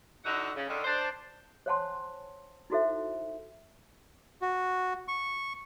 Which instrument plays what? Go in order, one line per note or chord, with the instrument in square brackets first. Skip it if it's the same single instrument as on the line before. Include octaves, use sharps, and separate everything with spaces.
[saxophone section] D3 D#4 E4 F#4 F#5
C#3
D3 D#3
D4 C5
[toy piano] C5 C#5 F#5 G#5 A5 C6
D#4 E4 F#4 A4 C5 E5
[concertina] F#4
C#6